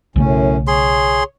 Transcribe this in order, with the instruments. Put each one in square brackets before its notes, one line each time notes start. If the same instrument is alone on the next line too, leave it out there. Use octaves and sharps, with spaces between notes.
[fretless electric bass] B1 C#3 A3 [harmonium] F#2 A2 C#4
[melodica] G#4 C6 [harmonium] C#5